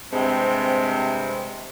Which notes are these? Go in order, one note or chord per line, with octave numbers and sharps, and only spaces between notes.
G2 C3 G#3 C4